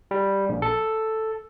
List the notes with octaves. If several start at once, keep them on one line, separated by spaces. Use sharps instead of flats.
G3
A#1
A4